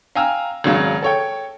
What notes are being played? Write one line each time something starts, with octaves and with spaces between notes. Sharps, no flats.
F5 G5 G#5 A#5 E6 F6
G#1 C#3 F#3 G#3
A4 C#5 G5